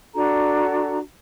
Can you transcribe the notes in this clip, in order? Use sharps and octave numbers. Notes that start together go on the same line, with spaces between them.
D4 F#4 A4 A#5